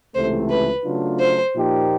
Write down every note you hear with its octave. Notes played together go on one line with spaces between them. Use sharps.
C#2 C3 E3 A3 C5
B4
C#3 F#3 A3 D4 F4
C5
A#2 F3 A#3 D#4 G4